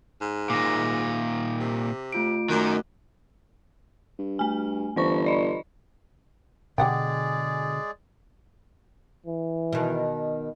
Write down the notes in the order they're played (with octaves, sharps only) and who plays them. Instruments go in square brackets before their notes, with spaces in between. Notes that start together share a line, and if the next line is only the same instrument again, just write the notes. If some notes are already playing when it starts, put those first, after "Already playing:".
[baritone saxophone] G#2
[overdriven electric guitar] A#2 D#3 [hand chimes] D6 A#6
[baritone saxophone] C3
[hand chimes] A3 F4 D7
[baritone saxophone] F#2 [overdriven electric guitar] D#3 [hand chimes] A3 F#4 F#6
[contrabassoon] G2
[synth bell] A3 G#5
[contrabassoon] G1 [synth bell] E3 C5 C#6
[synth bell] D5 D#5
[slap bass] B2 D3 [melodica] G#3 G#4 D5 [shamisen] G4 F#5 G5
[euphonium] E3
[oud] B2 D#3